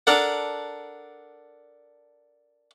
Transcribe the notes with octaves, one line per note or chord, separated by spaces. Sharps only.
D4 A4 A#4 D5 F#5